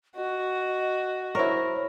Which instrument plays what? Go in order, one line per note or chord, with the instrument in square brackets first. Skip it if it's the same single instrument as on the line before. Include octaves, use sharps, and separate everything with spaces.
[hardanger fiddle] F#4 [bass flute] D#5
[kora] E4 A#4 [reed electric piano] C5 C#5 C#6